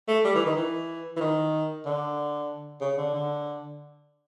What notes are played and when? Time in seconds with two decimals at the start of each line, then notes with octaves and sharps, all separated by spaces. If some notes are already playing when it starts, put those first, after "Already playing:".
0.08 A3
0.25 G3
0.35 E3
0.46 D#3
0.56 E3
1.16 E3
1.21 D#3
1.86 D3
2.81 C#3
2.97 D3
3.14 D3